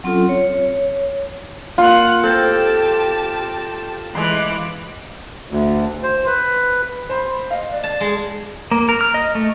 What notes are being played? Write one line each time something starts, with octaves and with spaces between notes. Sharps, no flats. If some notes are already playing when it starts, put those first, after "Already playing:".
F#3 C4 C#4 F4 A4
C#5
A#3 F4 F#5
C4 G4 A4 A5
E3 G#3 C6 D6
D2
C5
B4
C5 B5 C6
D#5 F5
D5
A5
G#3
A#3
A#4
F6
D#5
A3